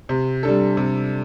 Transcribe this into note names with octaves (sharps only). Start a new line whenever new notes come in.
C3
G3 D4 A4
C3